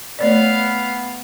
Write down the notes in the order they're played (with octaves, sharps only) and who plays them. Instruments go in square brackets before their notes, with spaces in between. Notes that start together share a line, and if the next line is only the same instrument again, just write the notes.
[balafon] A3 C#5 D5 [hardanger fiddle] B3 F5